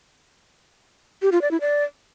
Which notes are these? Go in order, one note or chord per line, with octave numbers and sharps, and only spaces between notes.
G4
F4
D5
E4
D5